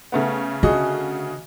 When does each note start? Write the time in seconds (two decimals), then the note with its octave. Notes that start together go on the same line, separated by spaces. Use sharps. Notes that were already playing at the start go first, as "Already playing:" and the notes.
0.12 C#3 A3 B3
0.63 D3 F#4 G#4 D#5